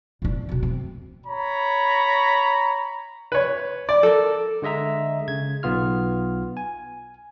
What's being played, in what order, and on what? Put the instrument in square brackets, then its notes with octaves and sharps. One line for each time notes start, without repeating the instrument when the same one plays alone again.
[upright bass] A#2 D4
F2 B2
C4
[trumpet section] C#5 A#5 B5
[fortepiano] B4 C#5
D5
[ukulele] A4 A#4
[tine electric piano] D3 G#3 D#5 E5 A#5
C#3 G#6
B1 B3 F4 F6
G#5